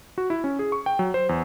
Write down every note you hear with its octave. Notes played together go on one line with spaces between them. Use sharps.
F#4
E4
C#4
G#4
C#6
G5
F#3
C5
E2